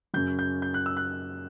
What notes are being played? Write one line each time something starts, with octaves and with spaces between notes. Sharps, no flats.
F#2 C#3 F#3 G6
G6
G6
F#6
E6
F#6